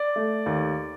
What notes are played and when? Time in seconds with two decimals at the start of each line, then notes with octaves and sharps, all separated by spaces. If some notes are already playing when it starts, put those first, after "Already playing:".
Already playing: D5
0.16 A3
0.46 D#2